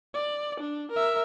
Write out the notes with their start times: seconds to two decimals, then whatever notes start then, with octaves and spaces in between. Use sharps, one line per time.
0.14 D5
0.60 D4
0.92 A#4 E5